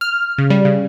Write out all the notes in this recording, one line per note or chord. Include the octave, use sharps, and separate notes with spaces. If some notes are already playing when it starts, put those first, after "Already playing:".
F6
C#3
G3
C#3